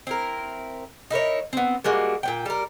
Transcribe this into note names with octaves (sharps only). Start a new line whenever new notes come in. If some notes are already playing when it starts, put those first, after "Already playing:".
C4 E4 A#4
D#4 E4 A#4 C#5
B3 C4
G3 G#3 A#3 F#4
A#2 B3 G5
G3 A#4